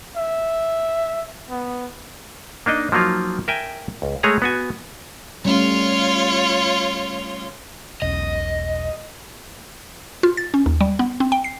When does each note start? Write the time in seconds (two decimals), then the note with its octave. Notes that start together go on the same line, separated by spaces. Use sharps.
0.17 E5
1.49 B3
2.66 A#3 D4 D#4 D#5
2.92 F3 F#3 A#3 D#4 F4
3.48 A#4 E5 G5 G#5
4.02 C#2
4.23 G#3 A3 G#4 C#5 A#5
4.42 B3 F#4 G#5
5.45 G3 A3 C#4 F4 C#5
8.02 E1 B1 C#4 D#5
10.23 F4
10.37 A6
10.54 C#4
10.66 D#2
10.81 G3
10.99 B3
11.20 C4
11.32 G5
11.44 C7